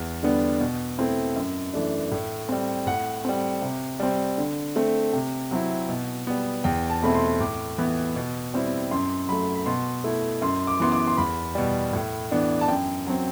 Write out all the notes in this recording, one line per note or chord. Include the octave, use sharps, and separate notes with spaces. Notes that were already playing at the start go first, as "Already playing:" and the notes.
Already playing: E2
D3 G3 B3 D4
B2
A3 C4 E4
F#2
E3 A3 D4
A2
G3 C4
A2 F#5
G3 C4
C3
G3 C4
D3
A3 C4
C3
F#3 C4 E4
B2
G3 B3
E2 G5
A5
B2 A3 C4 E4 B5
C6
A2 D6
E3 B3 E4
B2
G3 C4 E4
F#2 C6
F#3 A3 B5
B5
B2 C6
A3 E4
F#2 C6
D6
E3 B3 C6
D6
C6
E2 B5
B2 G3
A2
E3 B3 D4
A5
F#2 G5
F#3 C4